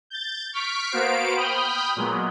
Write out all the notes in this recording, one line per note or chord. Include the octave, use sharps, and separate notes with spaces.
G6 A6
C#6 F6 B6 D7
A#3 B3 F#4 C5 F5 D7
G5 B5 D#6 F6 G6
A#2 F#3 G#3 B3